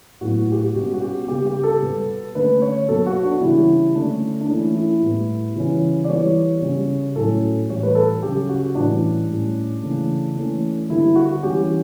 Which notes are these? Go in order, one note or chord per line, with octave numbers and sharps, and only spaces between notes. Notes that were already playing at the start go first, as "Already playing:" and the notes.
A2 F#3 B3 F#4
G4
F#4
B2 G3 C#4 G4
F#4
G4
C#3 G3 B3 G4
G4
A4
B2 G3 B3
D3 A3 C#4 B4
C#5
B2 F#3 B3 A4
F#4
D4
C#3 E3 G3 C#4 E4
D3 A3 C#4 D4
D4
E3 A3 C#4 E4
E4
A2 G3 B3
C#3 E3 G3 C#4
D5
E3 G3 B3 C#5
C#3 G3 C#4
A2 F#3 C#4 A4
A2 E3 G3 C#5
B4
A4
C#3 F#3 C#4 G4
F#4
A2 E3 G3 C#4 D4
A2 G3 C#4
C#3 E3 A3 C#4
E3 A3 C#4
D3 G3 B3 E4
F#4
F#4
E3 G3 C#4 G4